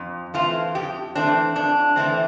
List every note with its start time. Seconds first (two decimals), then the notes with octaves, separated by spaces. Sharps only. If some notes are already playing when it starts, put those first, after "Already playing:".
Already playing: F2
0.34 E3 A3 C4 F4
0.75 F2 G4
1.15 E3 A3 C4 D4
1.55 F2 D4
1.96 E3 A3 C4